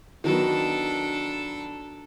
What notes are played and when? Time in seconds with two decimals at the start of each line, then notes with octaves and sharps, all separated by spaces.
0.24 D#3 F#3 B3 D4 A4